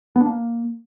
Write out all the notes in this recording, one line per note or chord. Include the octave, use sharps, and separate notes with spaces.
B3
D4
A#3